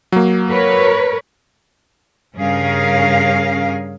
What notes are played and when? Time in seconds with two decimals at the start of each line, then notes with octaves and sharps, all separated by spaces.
0.12 F#3 A#3
0.49 A#4 B4 C#5
2.36 G2 C#3 C#4 G#4 A#4 F5